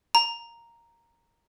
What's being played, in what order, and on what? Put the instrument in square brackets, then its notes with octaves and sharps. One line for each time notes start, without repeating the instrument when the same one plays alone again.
[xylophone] A#5